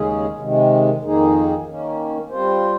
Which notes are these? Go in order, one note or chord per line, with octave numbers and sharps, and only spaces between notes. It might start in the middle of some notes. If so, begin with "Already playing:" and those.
Already playing: D#2 C#3 G#3 C#4 G#4
C3 D#3 G#3
F2 D#3 A#3 D#4 G#4
D#3 A#3 C#4
G3 C4 F4 C5